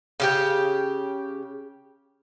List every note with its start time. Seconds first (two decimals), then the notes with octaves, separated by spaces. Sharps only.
0.20 C#3 G4 G5